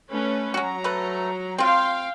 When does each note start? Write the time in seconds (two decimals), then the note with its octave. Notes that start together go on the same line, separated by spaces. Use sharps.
0.10 A3 C#4 B4
0.54 F#3 C#4 F#4 A#5
0.84 A3 B4
1.58 C4 F4 F5 G5